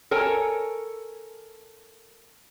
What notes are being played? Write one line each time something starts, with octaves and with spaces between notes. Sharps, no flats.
A4 A#4 C#5 G#5